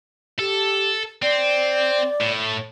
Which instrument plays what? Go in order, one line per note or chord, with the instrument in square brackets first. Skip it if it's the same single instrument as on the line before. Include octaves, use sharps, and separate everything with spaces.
[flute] G4 [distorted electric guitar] A4
[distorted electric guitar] C4 [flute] D5
[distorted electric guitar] A2